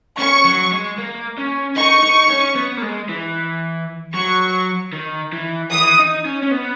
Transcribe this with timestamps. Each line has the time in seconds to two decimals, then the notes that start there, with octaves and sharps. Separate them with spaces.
0.19 C#4 C#6
0.45 F#3
0.72 G#3
0.98 A#3
1.38 C#4
1.76 D#4 C#6
2.03 D#4
2.30 C#4
2.55 B3
2.77 A#3
2.82 G#3
3.09 E3
4.14 F#3 C#6
4.93 D#3
5.33 E3
5.72 E3 D#6
5.99 D#4
6.25 C#4
6.43 C#4
6.51 B3